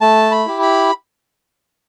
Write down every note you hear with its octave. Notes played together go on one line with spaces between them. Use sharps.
A3 A5
B5
E4 G4
B5